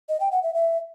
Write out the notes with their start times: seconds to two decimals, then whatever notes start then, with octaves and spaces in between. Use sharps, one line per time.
0.09 D#5
0.20 G5
0.31 F#5
0.43 E5
0.54 E5